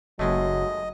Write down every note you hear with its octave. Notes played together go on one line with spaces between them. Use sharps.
F#1 D#2 F#3 G#3 A3 D#5